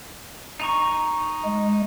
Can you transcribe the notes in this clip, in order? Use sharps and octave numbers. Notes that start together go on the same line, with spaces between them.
D#4 A#5 C#6
G#3